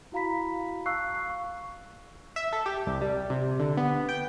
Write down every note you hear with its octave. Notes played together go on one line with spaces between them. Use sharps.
E4 F#4 F5 A#5 B5 B6
F5 A5 C#6 E6 F#6 C7
C#6
E5
A4
G4
C2
G3
C3
D3
B3
G5